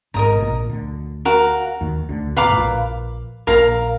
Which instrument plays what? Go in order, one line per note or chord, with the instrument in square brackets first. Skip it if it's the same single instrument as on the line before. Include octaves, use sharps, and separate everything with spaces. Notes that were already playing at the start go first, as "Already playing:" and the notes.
[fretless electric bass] G#1 G#2 [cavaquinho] A#4 D#5 A#5
[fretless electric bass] B2
A#1 A#2
D2 D3
[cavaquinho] F#4 A#4 F5 A#5
[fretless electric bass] D#2 D#3
D2 D3
[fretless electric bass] B2 [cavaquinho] B4 F5 A#5 D6
[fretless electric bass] A#2
G#2
A#1 A#2
[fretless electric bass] A#1 A#2 [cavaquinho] A#4 F5 A#5